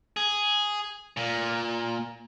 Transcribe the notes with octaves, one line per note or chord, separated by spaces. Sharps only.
G#4
A#2